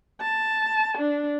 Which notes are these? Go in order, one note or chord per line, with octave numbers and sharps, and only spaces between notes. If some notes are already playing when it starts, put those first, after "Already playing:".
A5
D4